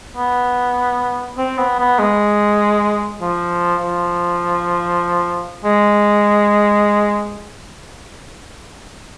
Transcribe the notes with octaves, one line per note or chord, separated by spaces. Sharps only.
B3
C4
B3
B3
G#3
F3
F3
G#3